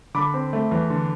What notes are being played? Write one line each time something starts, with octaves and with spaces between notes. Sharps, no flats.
D3 B5 D6
C4
A3
E2
D3